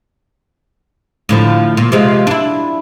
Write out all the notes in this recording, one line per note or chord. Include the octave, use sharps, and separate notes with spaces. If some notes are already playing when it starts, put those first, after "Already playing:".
A2 D3 F3
A#2
C3 F3 G#3
D4 E4